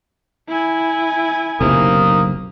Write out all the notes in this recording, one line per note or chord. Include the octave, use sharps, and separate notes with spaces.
E4 G#5
F#1 B1 C3 A#3 D#6